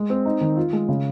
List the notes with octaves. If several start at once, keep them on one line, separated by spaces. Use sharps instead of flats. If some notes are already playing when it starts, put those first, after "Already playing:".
Already playing: G#3
C4
D#4
D#3
F4
G#3
C#3